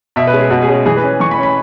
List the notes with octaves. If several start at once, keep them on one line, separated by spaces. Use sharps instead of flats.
B2 E5
B4
G#3 C#4
G#4
B2 F#4
G#4
G#3 C#4
E3 G#4
B4
C#4
E3 C#6
B5
C#4
B5